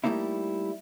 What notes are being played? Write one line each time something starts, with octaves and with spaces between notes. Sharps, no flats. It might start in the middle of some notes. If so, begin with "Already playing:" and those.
G3 A3 A#3 D#4 E4